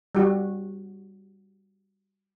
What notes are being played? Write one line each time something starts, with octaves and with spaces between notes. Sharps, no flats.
G3 F#4